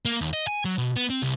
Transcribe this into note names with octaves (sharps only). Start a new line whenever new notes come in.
A#3
D#2
D#5
G#5
F#3
B2
B3
C4
C2